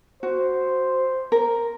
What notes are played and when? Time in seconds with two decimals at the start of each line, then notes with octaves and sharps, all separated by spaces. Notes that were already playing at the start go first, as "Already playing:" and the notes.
0.23 F#4 C5
1.32 A#4